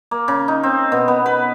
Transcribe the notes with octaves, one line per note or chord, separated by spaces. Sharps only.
A#3
C#3
D#4
C4
B2
B3
B4